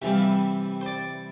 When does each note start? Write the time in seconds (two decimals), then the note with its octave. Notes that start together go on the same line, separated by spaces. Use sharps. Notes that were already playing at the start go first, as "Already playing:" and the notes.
0.02 C3 E3 G3 E5
0.11 F5
0.22 E5
0.81 C5
0.86 D5